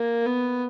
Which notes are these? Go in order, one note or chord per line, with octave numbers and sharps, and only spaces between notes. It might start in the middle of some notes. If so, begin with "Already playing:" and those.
Already playing: A#3
B3